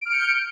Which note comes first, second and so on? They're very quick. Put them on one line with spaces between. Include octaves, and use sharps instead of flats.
D7 F6 C#7 G6